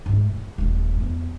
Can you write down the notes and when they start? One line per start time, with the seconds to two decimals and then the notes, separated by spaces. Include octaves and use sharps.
0.06 G#2 A3
0.31 A2
0.58 D#1 A3
1.00 E2